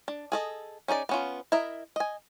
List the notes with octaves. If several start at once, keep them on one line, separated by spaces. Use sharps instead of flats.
D4
G#4 A4 D#5
C#4 D#4 G#4 D5
B3 C#4 F4
E4 A#4 D#5 E5
D#5 G#5